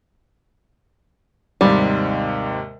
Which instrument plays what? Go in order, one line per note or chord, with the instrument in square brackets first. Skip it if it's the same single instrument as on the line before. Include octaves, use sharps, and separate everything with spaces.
[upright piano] D#2 G#2 C3 [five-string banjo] G3